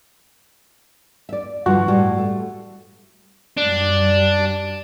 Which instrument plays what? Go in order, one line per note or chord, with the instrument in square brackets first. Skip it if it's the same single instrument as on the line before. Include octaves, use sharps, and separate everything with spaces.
[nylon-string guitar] D5 E5
[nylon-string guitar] G2 D3 F3 [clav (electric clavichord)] F#4
[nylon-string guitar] A2 G3
A3
[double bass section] F#2 G3 [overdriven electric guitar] D4